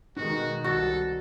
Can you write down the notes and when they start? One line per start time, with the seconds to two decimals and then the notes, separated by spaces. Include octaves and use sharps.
0.17 B2 D#3 G#3 D#4 F#4
0.64 C2 F#4 A4